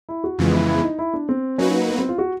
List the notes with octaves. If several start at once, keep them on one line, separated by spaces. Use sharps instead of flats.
E4
F#4
F2 C#3 E3 G#3 B3 F4
E4
E4
D#4
E4
D4
C4
F#3 A#3 C#4 D#4 F#4 B4
B3
C4
F4
F#4